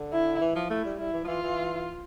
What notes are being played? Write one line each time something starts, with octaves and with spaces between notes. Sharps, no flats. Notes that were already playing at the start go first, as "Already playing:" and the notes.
Already playing: D3
E4
E3
F3
A3 E4
G3
G3 E4
E3
F3
E3 F4
E3